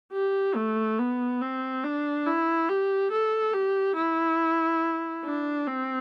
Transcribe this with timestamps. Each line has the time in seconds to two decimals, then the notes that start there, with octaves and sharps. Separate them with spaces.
0.13 G4
0.56 A3
0.99 B3
1.41 C4
1.84 D4
2.26 E4
2.69 G4
3.12 A4
3.54 G4
3.96 E4
5.24 D4
5.67 C4